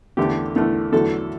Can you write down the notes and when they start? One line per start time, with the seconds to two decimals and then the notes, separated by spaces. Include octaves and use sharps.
0.17 E2 D3 A3 G4
0.56 E2 D3 A3
0.92 E2 D3 F#3 A3 A4